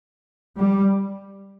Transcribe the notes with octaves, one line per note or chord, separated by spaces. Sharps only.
G3